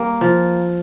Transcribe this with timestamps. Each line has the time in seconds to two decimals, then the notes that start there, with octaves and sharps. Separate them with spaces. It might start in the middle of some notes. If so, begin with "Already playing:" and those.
Already playing: G3 A#3
0.21 F3